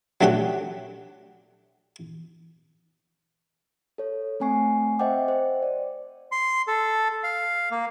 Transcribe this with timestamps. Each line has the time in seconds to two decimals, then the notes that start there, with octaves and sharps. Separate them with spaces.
0.21 F#3 A3 D4 G4 F#5
3.98 A4 C#5
4.40 A3 C4 G#5 C#6 C7
4.99 C5 D#5 E5 F#5 G5 D6
5.28 C5
5.62 D5
6.32 C6
6.67 A4
7.23 F5
7.71 A#3